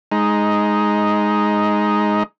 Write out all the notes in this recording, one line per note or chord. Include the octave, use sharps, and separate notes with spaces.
G#3 D#4